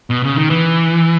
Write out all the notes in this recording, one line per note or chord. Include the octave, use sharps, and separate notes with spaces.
B2
C#3
D#3
E3